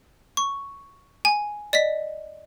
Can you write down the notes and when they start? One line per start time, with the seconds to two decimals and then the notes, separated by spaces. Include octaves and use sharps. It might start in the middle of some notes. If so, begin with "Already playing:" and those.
0.37 C#6
1.25 G#5
1.73 D5 D#5 B6